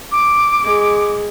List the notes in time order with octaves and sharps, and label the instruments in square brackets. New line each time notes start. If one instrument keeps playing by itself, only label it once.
[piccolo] D6
[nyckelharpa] G#3